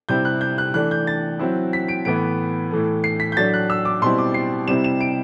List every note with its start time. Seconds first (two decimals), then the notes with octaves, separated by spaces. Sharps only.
0.09 C3 G3 C4 E4 G6
0.25 F#6
0.41 G6
0.58 F#6
0.74 E3 A3 D4 F#6
0.91 G6
1.07 A6
1.39 F#3 C4 E4
1.73 B6
1.88 D7
2.05 A2 E3 B3 D7
2.71 A2 E3 A3
3.04 C7
3.20 B6
3.32 G6
3.37 A2 F#3 A3 D4 A6
3.54 F#6
3.70 E6
3.85 D6
4.02 B2 G3 C4 E4 C6
4.18 D6
4.34 C7
4.68 C3 G3 C4 E4 E7
4.84 E7
5.01 D7